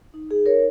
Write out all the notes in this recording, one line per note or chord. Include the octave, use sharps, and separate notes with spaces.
D#4
G#4
D#4
A#4 C#5